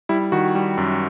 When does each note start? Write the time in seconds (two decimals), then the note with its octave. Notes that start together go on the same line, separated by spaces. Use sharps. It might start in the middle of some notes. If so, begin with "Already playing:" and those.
0.09 G3 E4
0.32 D#3 F#4
0.55 G3
0.78 F#2